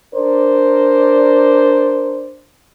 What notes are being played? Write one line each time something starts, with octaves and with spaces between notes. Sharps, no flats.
D4 A#4 C5 D5